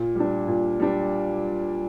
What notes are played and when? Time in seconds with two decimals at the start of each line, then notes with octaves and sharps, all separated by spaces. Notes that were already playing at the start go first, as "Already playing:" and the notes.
Already playing: A#2
0.15 G3 D4
0.48 A#2
0.80 G3 D4